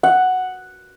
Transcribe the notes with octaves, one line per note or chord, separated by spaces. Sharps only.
F#5